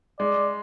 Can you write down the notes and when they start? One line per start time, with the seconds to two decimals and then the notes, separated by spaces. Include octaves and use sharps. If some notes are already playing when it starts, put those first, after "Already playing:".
0.19 G#3 D5